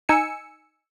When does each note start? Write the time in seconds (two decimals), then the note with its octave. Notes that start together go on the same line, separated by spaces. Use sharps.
0.09 D#4 G#5 E6 C#7